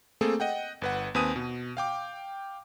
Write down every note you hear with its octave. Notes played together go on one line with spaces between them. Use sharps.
A3 A#3 C4 G#4 A4
D#5 F#5 G5
G1 B4 F#5
D#2 C4 B4 G#5 D#6 D#7
B2
F5 G5 D6